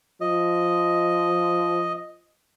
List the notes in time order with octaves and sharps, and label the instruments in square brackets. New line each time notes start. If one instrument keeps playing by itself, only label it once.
[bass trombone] F3 [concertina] D#5